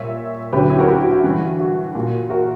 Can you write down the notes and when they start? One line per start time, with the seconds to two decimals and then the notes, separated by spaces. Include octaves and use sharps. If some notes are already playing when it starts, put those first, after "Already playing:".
Already playing: A#2 G3 C#5 E5
0.53 D2 D3 F#3 G4 B4
0.70 E4 G4
0.79 F#4 A#4
0.88 E4 G4
1.00 F#4
1.11 F#4
1.24 G2 E3 G3
1.60 F#4
1.95 A#2 G3
2.30 F#4 A#4